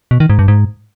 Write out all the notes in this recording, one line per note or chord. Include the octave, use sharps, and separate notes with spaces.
B2
D#3
G#2
G2
G#2